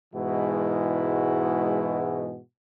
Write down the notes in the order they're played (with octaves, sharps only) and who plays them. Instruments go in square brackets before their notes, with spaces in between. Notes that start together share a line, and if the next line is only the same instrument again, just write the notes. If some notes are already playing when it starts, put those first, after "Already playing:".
[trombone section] G#2 B2 E3 G#3 E4 F#4